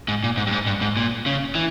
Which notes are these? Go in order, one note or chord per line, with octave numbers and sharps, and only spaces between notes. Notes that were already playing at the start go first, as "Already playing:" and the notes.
G#2
A#2
G#2
G2
G#2
G2
G#2
A#2
C#3
E3